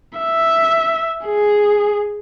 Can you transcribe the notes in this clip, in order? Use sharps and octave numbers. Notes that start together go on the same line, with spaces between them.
E5
G#4